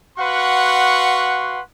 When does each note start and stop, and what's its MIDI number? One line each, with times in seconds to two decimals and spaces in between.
0.18 1.59 66
0.18 1.59 71
0.18 1.59 77
0.18 1.59 78
0.18 1.59 84
0.18 1.59 85